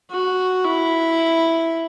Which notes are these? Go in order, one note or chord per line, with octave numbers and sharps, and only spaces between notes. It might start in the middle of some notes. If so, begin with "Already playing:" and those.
F#4
E4